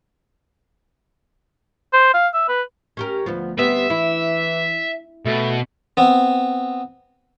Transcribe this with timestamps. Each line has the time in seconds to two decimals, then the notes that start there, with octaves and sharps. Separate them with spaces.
1.93 C5
2.14 F5
2.34 E5
2.49 B4
2.97 C#4 G4 A#4
3.26 D2 F3 B3
3.58 D2 G3 B3 C4 E5
3.90 E3 E4
5.26 B2 A3
5.97 B3 C4